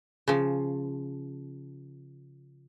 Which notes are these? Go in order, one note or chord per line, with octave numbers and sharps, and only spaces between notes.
C#3 F3